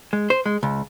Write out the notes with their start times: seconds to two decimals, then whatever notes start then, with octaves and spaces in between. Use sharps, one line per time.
0.13 G#3
0.30 C5
0.46 G#3
0.63 C#2